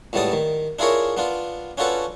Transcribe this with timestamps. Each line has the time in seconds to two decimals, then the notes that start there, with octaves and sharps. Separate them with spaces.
0.13 C#2 A2 G3 B3 A5 D#6
0.32 D#3
0.79 D4 E4 F4 G#4 A#4 C#5
1.17 B3 D4 F4
1.78 C#4 D4 F4 F#4 A4 B4